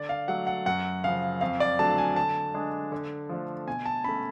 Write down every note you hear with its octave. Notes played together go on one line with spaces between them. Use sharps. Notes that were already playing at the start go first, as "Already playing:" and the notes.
Already playing: D3 D5
F5
F#3 A3 F#5
F#5
F#2 F#5
C#3 F3 F5
F2 F5
D5
D3 F#3 A3 D4 A5
G#5
D3 A5
G#3 D4
D3
F3 A3 D4
B2 G#5
A5
A3 C#4 B5